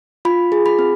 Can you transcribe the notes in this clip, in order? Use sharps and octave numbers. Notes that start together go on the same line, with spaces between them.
F4 B5
G#4
B5
C4